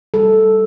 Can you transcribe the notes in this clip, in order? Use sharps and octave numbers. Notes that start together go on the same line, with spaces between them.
G3 A4